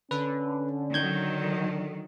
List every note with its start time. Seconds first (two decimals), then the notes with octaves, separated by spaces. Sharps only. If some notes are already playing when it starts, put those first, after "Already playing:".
0.11 D3 C#4 B4
0.94 D#3 F#3 G6 G#6